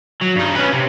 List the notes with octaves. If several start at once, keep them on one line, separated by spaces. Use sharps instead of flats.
F#3
G2 D#4
C#4 B4
C3